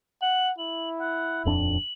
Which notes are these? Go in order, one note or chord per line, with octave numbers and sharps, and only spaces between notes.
F#5 F#7
E4 F#7
F#5
D#1 F2 D4 F#7